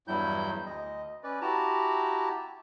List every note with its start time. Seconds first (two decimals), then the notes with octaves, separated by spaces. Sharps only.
0.08 E2 G2 F#3 G3 E4 G6
0.66 D2 D#5
1.23 C#4 B4 D5
1.41 E4 F#4 G4 A5 A#5